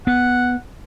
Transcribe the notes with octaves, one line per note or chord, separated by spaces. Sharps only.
B3 F#5